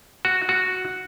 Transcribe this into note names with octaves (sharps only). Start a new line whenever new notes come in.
F#4
F#4